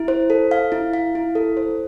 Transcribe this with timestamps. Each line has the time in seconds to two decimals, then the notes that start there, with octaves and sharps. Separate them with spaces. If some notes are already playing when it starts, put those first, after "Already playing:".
Already playing: E4
0.08 C5
0.30 A4
0.51 F5
0.72 E4
0.94 F5
1.15 E4
1.35 A4
1.57 C5